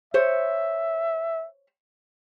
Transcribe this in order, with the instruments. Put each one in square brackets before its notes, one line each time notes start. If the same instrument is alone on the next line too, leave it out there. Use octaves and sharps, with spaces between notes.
[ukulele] C5 C#5 [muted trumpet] E5